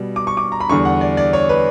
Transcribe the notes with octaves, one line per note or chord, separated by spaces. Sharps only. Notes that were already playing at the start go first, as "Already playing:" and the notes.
Already playing: B2 G3
D6
C#6
D6
A#5
B5
E2 D3 G3 C#6
F#5
D5
D5
C#5
B4